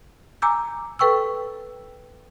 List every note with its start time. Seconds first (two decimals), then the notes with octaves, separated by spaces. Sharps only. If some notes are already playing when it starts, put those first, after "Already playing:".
0.42 G#5 A#5 D6 E6 G6
0.99 A4 B4 G5 C#6 E6